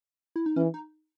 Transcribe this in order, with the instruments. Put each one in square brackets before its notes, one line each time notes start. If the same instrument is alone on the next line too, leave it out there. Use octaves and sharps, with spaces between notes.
[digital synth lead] E4
D#4
[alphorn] E3 [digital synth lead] C#4
[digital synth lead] D#4